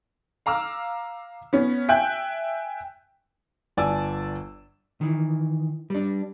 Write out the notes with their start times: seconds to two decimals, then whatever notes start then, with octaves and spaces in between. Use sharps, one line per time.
0.46 F5 A#5 D6 E6 F6
1.53 B3 C#4
1.89 E5 G5 G#5 F#6 G6
3.77 G1 D5 G#5 A5 E6
5.01 D#3 E3
5.90 G3 D4